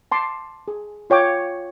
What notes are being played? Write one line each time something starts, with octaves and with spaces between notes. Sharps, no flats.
A5 C6 D6
G#4
F4 C#5 G5 D6